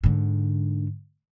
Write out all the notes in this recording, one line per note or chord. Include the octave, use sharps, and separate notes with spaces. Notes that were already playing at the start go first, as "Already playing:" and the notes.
G#2 D3